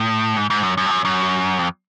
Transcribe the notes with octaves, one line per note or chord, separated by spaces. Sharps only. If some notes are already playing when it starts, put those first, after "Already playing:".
Already playing: A2
G#2
G#2
F#2
F#2
G2
F#2
F#2
F2